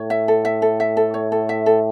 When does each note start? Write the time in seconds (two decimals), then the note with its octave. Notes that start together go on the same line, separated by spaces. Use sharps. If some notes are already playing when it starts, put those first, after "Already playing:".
Already playing: A2 C#5
0.10 E5
0.28 A4
0.45 E5
0.62 A4
0.80 E5
0.97 A4
1.14 C#5
1.32 A4
1.49 E5
1.66 A4